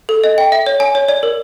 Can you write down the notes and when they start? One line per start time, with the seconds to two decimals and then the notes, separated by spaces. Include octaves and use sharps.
0.09 A4
0.24 D#5
0.38 G5
0.52 E5
0.66 C#5
0.80 G#5
0.95 C#5
1.09 D5
1.23 A#4